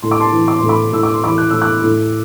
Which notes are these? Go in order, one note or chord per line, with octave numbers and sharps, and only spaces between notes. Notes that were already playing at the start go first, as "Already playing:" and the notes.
A2 C6
D6
A5 C6
E3
D6
C6
A2
B5 D6
A2 E6
D6
C6
E3 B5 D6
F#6
A2 E6
D6 F#6
A2